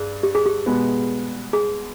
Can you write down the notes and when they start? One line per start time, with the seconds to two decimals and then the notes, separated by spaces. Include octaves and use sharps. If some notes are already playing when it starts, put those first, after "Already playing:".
Already playing: G2 G#4
0.23 G4
0.35 G#4
0.46 G4
0.66 B2 G#3 B3
1.53 G#4